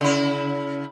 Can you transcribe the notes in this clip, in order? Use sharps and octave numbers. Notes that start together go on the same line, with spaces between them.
C#3 E4